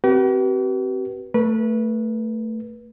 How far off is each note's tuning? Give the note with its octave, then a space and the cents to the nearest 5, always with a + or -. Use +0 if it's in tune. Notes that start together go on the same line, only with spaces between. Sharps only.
C4 +0 G4 -45 B4 -30
A3 +15 B4 -25